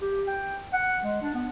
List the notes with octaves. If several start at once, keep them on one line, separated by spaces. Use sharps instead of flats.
G4
G5
F#5
G#3
D4
B3